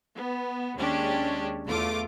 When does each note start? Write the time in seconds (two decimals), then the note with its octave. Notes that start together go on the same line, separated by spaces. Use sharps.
0.15 B3
0.75 D#2 G#3 C#4 D4 G4
1.65 E2 A3 F4 D6